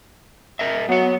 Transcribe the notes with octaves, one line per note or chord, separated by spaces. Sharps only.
A#4 D#5 E5
F#3 B3 F#5